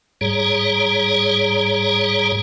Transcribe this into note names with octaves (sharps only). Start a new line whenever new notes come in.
G#2 G3 G#4 C#5 A#5